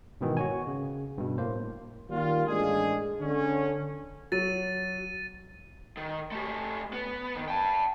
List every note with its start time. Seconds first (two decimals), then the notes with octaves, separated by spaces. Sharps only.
0.21 G#2 B2 D#3 E3
0.37 F#4 C#5 G#5
0.67 C#3
1.18 G2 B2
1.38 A2 A#3 C5
2.10 D#3 G3 A#3 F4
2.47 A1 G#3 D4 G#4
3.21 D3 C#4
4.32 F#3 A6 D#7
5.97 D#3
6.32 A3 G4
6.93 B3
7.36 D#3
7.48 G5 A5